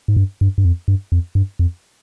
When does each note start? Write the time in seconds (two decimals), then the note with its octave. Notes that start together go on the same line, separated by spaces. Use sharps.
0.08 G#2
0.17 G2
0.41 G2
0.58 G2
0.65 F2
0.88 G2
1.12 F2
1.35 G2
1.59 F2